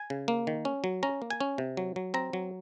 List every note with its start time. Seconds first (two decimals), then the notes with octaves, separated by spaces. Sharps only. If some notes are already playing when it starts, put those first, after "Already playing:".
Already playing: G#5
0.10 C#3
0.28 A#3
0.47 D#3
0.65 C#4
0.84 F#3
1.03 C#4 A#5
1.22 A#3
1.30 G#5
1.41 C#4
1.58 C3
1.77 F#3
1.96 F#3
2.14 C4 A#5
2.33 F#3